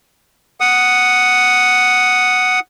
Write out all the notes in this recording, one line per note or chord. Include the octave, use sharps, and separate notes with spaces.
F#5 D#6